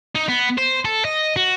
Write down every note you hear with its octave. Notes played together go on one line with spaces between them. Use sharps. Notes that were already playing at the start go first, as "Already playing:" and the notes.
D#4
B3
C5
A4
D#5
F#4